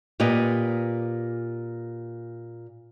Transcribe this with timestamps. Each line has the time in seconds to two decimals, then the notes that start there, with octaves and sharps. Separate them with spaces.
0.20 A#2 G4 B4 D#5